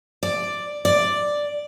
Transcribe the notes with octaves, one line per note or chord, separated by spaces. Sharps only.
D5
D5